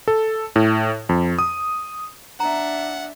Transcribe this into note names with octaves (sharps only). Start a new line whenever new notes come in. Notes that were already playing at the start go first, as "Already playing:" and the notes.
A4
A2
F2
D#6
D4 E5 F#5 A#5